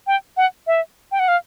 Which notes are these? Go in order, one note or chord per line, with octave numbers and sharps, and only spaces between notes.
G5
F#5
E5
G5
F#5
F5